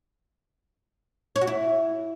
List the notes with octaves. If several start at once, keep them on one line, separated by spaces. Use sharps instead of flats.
C#5
F#4
E4